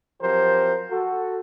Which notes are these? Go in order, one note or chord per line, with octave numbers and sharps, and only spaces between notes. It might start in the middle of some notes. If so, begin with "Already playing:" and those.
F3 F#3 C4 G4 A#4 C5
F#4 A4